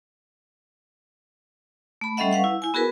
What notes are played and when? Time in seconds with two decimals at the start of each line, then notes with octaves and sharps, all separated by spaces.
2.01 A3 B5
2.17 G3 C#4 A4 D#5 E5 F#5
2.31 B4 F5 F#5 C#6
2.44 E4
2.62 E4 G#5
2.74 B3 F#4 G#4 A#4 B4